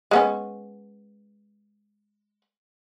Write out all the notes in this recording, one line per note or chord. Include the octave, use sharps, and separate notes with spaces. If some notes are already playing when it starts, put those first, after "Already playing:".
G#3 B3 C#4